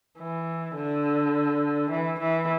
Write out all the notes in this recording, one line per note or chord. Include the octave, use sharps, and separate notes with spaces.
E3
D3
E3
E3